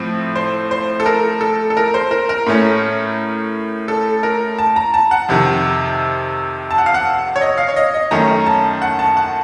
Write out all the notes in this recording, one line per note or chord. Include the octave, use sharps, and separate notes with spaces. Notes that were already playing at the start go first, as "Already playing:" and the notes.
Already playing: A2 F3 C4
C5
C5
A4
A#4
A4
A4
A#4
C5
A#4
A#4
A2 A3 C#4
A4
A#4
A5
A#5
A5
F#5
F2 C3 D#3
A5
F#5
F5
F#5
C#5
D#5
F5
C#5
D#5
D#5
F#2 D#3 A3 C#4 A#5
A5
F#5
A5
F#5